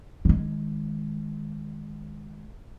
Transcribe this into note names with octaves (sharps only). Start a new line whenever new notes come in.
D#3 G#3